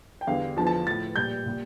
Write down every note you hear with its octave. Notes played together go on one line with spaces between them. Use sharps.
G5
E2 D3 G3 F5
E2 D3 F3 A5
A5
A2 F3 A6
A#2 G3 G6
A#2 G3